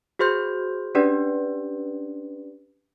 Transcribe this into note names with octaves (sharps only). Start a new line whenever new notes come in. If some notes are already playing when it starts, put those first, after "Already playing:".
F#4 G#4 C5 C6 G6
C#4 D4 G4 B4 D5